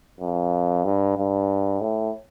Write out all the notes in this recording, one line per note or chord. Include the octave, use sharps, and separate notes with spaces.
F2
G2
G2
A2